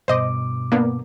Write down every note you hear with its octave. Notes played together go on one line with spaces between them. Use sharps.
G2 B2 C5 D#5 D6
A#3 B3 D4